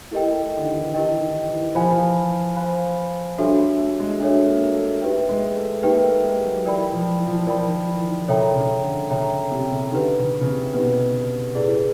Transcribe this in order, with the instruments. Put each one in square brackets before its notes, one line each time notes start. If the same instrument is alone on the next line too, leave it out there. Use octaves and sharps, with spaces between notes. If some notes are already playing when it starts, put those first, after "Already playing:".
[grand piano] A3 [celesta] E4 G4 A#4 D#5 G5
[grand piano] A3
D3
D#3
E3
[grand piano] D#3 [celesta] E4 G4 A#4 D#5 G5
[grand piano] D#3
E3
[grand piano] F3 [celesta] C5 F5 G#5 B5
[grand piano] E3
F3
[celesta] C5 F5 G#5 B5
[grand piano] G3 [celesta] D4 F#4 A4 C#5 E5
[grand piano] A3
A3
G#3
[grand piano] A3 [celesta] D4 F#4 A4 C#5 E5
[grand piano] A#3
A3
[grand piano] A3 [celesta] D#4 G4 B4 E5 G5
[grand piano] G#3
A3
[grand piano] A#3 [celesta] D#4 G4 B4 E5 G5
[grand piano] A3
G#3
F#3
[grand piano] E3 [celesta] A#4 D5 G5 B5
[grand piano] F3
E3
F3
E3
[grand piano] F3 [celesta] A#4 D5 G5 B5
[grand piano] D#3
E3
D#3
[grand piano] C#3 [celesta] A4 C#5 E5 G5 A#5
[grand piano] C#3
D3
[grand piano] C#3 [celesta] A4 C#5 E5 G5 A#5
[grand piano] C3
C#3
[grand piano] D3 [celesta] D#4 G4 B4
[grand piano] C#3
C#3
C3
[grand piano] B2 [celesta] D#4 G4 B4
[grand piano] A2 [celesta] E4 G#4 B4 D5